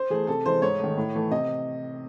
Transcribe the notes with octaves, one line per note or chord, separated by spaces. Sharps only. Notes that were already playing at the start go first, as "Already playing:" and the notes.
Already playing: C5
E3 A3 G#4
C3 A4
E3 G#3 C5
G#2 C#5
D#3 A3
A2
E3 A3
C3 D#5